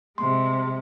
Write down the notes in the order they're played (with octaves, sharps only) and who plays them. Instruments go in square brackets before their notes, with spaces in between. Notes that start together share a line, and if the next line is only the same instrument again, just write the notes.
[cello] C3 G#3 [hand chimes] C6